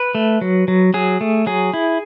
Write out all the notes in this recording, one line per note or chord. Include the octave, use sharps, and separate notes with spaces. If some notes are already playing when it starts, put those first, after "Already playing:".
Already playing: B4
A3
F#3
F#3
F#3 G#4
A3
F#3 G#4
E4